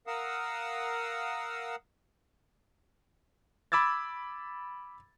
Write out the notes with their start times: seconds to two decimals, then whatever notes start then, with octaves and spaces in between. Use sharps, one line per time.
0.07 A#4 F5 F#5 D#6 E6
3.72 B5 D6 E6 G#6 A6